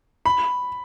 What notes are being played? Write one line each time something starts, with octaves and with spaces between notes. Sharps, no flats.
B5